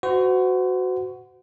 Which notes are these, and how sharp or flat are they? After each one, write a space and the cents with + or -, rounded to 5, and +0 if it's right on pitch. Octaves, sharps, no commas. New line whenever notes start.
F#4 +0 C5 -40